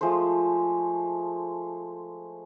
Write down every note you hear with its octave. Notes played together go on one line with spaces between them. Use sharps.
F3 G#3 A3 C5